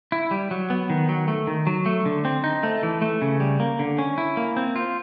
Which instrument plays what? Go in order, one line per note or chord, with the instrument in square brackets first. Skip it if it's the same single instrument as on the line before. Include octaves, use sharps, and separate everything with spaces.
[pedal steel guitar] E4
G3
F#3
B3
D#3
F#3
A3
D#3
F#3
A3
D3
C4
D#4
A3
E3
A3
C#3
G3
A#3
D3
C#4
E4
A#3
C4
F4